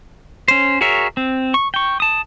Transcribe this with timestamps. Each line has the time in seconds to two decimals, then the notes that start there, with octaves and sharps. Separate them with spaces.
0.48 C#4 C5
0.81 F#4 G#4 A#4 C#5 E5
1.17 C4
1.54 C#6
1.74 G5 C#6
2.00 A5 D#6